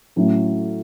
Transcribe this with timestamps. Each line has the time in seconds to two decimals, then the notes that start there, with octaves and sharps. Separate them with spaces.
0.16 A2 F#3 A3 C#4